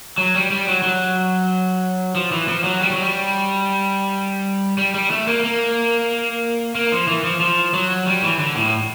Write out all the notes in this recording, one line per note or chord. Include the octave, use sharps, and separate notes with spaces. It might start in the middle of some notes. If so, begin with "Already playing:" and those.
F#3
G3
G3
F#3
F#3
F3
E3
F3
F#3
G3
F#3
G3
G3
G3
A3
A#3
A#3
A#3
F3
E3
F3
F3
F#3
G3
E3
D3
A2